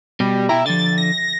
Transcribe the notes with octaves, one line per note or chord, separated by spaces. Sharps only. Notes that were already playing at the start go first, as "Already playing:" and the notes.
B2 G3
B2 E4 G5 A#5
D3 F3 A6
A#6